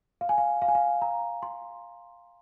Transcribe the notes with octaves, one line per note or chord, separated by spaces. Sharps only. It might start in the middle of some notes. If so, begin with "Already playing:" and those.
F5
G#5
F5
F5
G#5
F5
A#5
C6